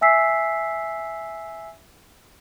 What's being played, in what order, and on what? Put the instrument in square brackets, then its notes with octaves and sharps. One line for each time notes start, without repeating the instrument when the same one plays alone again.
[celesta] E5 G#5 E6 B6 C7